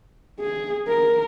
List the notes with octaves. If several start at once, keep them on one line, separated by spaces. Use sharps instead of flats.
G#4
A#4